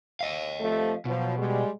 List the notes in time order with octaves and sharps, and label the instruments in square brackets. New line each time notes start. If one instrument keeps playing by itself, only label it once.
[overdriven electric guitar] D#5 F5
[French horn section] C3 F3 A3
[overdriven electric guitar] B2 [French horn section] F3 F#3
[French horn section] G3 G#3